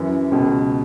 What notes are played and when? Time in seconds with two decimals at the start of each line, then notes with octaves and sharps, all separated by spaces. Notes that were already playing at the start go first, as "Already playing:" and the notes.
Already playing: F#2 E3
0.31 C#2 B2